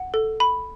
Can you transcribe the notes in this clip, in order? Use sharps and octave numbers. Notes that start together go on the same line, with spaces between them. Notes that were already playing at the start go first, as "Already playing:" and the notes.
Already playing: F#5
A4
B5